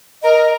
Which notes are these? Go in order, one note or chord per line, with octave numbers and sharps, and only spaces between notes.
A#4 D#5